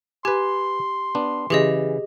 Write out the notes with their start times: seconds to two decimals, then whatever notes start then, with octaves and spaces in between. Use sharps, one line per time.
0.25 G4 B4 G#5 C6
1.15 B3 D4
1.50 C#3 E3 G4 G#4 D#5